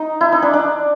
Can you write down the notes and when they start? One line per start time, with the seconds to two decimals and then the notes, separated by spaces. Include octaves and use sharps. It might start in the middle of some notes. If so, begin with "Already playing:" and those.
Already playing: D#4
0.21 E4
0.32 D#4
0.42 D4
0.53 D4